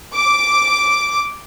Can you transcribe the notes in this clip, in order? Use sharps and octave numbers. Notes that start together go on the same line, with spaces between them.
D6